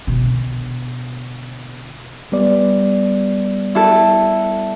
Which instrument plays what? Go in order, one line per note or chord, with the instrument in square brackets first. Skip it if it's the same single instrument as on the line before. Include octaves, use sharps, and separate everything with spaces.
[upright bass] B2 D3
[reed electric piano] G3 B3 D5
[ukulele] E4 A4